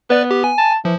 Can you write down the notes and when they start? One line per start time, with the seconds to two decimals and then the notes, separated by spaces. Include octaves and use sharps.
0.10 B3 B4 D5
0.31 G4
0.44 G#5
0.58 A5
0.85 E3 F3